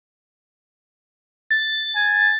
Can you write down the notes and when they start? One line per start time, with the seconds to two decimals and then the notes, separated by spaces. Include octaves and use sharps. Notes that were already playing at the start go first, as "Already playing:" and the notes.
1.50 A6
1.96 G#5